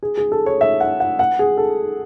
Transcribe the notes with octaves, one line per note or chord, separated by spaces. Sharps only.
G#4
G#4
A4
C#5
E5
F#5
F#5
F#5
G#4
A4